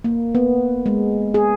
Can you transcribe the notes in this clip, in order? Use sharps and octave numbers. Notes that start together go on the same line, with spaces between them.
A#3
B3
G#3
G#4